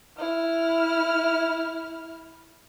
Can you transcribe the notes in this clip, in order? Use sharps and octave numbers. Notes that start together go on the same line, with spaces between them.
E4 F6